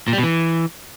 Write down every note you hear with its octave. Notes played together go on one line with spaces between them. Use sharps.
A#2
G3
B2
E3